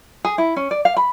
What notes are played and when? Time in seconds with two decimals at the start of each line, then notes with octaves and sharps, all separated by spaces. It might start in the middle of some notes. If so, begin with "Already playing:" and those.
0.24 G#4
0.38 E4
0.56 C#4
0.71 D5
0.85 F5
0.96 B5